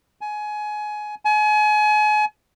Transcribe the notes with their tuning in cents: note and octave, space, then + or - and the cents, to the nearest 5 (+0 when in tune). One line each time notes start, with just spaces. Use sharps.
G#5 +20
G#5 +35